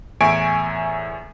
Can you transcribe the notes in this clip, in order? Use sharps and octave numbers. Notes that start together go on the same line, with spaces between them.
E2 A2 E5 G#5 C#6 D7